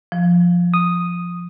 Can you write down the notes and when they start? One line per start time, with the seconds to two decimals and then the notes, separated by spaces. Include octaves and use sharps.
0.12 F3
0.74 D#6